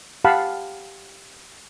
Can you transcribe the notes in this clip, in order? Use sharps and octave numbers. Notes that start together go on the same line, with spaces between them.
G4 F5 F#5 A5 B5